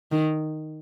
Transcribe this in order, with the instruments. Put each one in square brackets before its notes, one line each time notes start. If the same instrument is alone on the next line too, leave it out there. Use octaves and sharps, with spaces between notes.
[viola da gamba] D#3